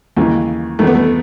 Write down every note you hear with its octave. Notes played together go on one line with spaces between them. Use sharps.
D#2 C#3 E3
E2 D#3 A3
B3
A3